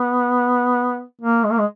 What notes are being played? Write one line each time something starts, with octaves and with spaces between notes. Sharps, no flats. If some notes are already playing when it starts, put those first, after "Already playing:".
Already playing: B3
A#3
G#3
A#3
G#3